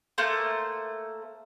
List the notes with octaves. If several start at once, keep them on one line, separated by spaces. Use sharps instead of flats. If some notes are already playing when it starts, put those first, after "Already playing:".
A3 A#3 C5